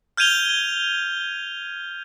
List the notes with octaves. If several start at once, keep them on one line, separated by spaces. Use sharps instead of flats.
F6 G6 G#6 D#7 F7 G7